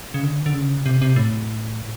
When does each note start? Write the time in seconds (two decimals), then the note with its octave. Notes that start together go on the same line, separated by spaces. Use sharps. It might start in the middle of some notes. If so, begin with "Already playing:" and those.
0.14 C#3
0.23 D3
0.46 D3
0.54 C#3
0.86 C3
1.02 C3
1.16 A2